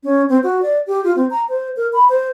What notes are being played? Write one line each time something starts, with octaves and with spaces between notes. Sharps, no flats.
C#4
C4
F#4
D5
G4
F4
C4
A#5
C5
A#4
B5
C5